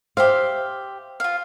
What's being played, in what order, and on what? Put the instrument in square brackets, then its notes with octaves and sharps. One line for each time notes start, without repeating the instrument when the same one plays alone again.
[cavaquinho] G4 E5 F5 [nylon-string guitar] C5
[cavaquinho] F4 F5